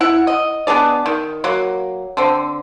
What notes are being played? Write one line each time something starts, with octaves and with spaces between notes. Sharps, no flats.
E4 F#5
D#5
B3 D4 G#4 D5
D#3
F#3 A#3
D3 C4